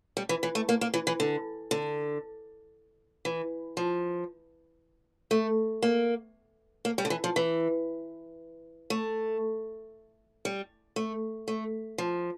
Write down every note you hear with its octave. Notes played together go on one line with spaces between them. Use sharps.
G3
E3
E3
A3
A#3
A#3
E3
E3
D3
D3
E3
F3
A3
A#3
A#3
G3
D3
E3
F3
E3
A3
G3
A3
A3
F3